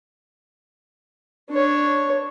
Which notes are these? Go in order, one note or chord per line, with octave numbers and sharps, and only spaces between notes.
D4 C#5